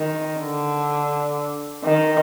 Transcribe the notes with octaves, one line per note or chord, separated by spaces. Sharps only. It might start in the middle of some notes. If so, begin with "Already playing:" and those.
Already playing: D#3
D3
D#3